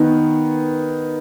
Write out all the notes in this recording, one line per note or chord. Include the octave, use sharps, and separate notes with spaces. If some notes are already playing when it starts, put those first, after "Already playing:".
Already playing: D#3 B3